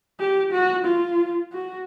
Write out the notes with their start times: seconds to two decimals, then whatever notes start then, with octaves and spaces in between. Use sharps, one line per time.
0.20 G4
0.52 F#4
0.85 F4
1.53 F#4